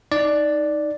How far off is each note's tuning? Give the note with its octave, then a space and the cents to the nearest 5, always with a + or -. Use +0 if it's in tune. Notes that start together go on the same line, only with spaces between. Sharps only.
D#4 +0 D5 +0